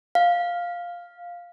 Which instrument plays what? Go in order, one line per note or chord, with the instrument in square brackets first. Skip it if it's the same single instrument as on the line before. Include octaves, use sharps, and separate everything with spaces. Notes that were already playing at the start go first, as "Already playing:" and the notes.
[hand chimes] F5